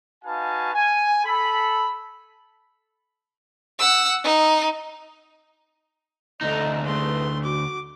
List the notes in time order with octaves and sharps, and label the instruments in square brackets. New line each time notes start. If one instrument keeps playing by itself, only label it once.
[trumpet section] D#4 F#4 B4 F5 G#5 A5
G#5
A4 B5
[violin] F#5 E6
D#4
[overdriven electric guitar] D2 D#4 [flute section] A4 D#5 A#5
[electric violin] A3 C6 [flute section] G#4 B4
[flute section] F#4 [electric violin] D6